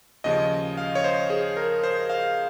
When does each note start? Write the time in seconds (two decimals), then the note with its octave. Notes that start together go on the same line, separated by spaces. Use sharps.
0.24 D#2 C#3 F3 D#5
0.77 F5
0.95 C#5
1.04 C5
1.30 G#4
1.57 A#4
1.83 C5
2.10 F5